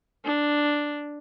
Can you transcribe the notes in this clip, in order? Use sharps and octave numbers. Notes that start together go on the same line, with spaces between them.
D4